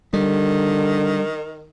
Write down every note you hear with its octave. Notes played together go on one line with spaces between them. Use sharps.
D3 D#3 G3